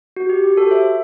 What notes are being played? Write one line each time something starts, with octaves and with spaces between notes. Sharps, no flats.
F#4
G4
G4
F#4 A4
C5 E5